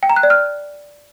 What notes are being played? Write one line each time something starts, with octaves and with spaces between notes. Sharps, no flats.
G5
A#5
F#6
D5
F6